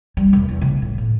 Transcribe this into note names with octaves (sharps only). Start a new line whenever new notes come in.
G3
E1
E2
C#3
A2
A2